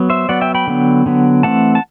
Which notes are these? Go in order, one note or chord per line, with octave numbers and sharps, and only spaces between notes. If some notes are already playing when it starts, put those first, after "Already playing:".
Already playing: F#3 B3
C5 E5
F#3 B3 D5 F#5
E5 G5
G5 B5
D3 F#3 B3
D3 F#3 B3
E3 A3 C4 F#5 A5
A5